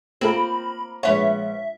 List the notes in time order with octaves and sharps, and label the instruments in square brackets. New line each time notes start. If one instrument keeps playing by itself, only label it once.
[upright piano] A#3 F4 A#4 [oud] C4 [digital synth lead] B5
[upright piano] A#1 G#3 F#5 [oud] B4 C#5 [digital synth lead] E5